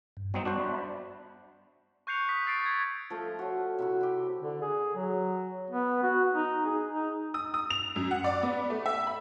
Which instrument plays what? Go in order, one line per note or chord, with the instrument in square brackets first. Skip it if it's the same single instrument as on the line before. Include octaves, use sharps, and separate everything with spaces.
[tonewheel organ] G2
[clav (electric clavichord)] F#3 C4 D#4 [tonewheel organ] G3 B3 D5
[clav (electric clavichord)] D4 F#4 C5
[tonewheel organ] D5 E5 B5
[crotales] C#6 F#6 G6 C7 C#7 F7
D#6 B6
E6 A6 C7 D7
G#6
[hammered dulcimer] F3 A3 F4
F#4 C#5
C3 E4 F#4
E4 G4
[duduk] D3
G#4
F#3
B3
F#4
D#4
G#4
D#4
[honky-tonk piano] D#6
D#6
F7
F#2
F#5
D5
B3
A3
E5
B5